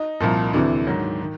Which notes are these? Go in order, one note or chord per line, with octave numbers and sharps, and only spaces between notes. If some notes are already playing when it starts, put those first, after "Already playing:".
Already playing: D#4
C2 A#2 F3
D2 C3 E3 D4
G#2 D#3 F#3
D#3